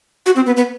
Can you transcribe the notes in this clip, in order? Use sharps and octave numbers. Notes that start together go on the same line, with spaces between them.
F#4
C4
B3
B3